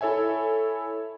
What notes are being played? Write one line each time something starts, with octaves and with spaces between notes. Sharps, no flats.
E4 A4 C#5 E5 G#5